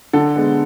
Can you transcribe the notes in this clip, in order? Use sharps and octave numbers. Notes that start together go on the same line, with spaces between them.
D3 A4
G#3 B3